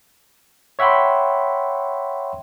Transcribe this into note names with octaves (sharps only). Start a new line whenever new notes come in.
C#5 E5 F#5 G5 B5 C6